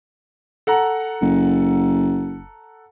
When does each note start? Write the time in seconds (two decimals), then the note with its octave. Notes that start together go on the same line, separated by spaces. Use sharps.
0.67 A4 F#5 A#5
1.22 F#1